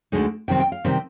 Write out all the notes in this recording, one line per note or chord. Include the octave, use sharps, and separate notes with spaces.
D2 D3 G#3 D#4
C3 D#3 G3 C4 G5
G5
F5
C3 D#3 G3 C4